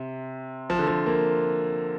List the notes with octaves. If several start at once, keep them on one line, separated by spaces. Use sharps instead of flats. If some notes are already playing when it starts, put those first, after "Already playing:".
Already playing: C3
F3
D3
F3
A#3